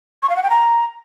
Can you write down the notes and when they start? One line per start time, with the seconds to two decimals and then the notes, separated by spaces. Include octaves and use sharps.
0.23 C#6
0.29 F5
0.36 F#5
0.43 G5
0.50 A#5